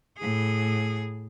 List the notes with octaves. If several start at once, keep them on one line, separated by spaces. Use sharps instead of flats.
A2 G#4